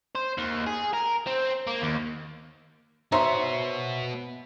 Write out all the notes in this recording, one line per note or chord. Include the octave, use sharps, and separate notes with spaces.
C5
D#2
G#4
A#4
C4
A#3
D#2
B3 D#4 F#4 C5 C#5 E5 C6